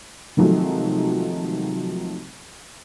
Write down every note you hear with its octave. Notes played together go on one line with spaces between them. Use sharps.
C3 D#3 F3 F#3 G#3 A3